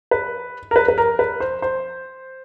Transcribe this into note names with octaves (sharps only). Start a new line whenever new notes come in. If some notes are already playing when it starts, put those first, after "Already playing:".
B4
A#4
B4
B4
A#4
B4
C5
C5